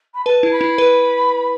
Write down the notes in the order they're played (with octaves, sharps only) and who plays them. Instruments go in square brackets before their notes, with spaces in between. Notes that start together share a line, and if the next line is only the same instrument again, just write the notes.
[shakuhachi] B5
[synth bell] B4 [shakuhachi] A5
[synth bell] E4
[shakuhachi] B5
[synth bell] E4
B4